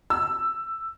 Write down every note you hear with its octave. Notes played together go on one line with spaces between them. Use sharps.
E6